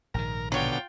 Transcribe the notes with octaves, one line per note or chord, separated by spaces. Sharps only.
A#1 G#2 D#3 A#4
B2 D3 F#3 F4 C#5 G5